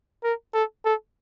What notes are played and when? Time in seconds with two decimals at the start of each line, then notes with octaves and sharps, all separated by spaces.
0.24 A#4
0.54 A4
0.85 A4